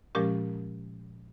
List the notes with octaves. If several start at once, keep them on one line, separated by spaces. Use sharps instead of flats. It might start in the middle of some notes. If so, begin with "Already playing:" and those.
A#2 F3 G#3 C#4 G4 A#4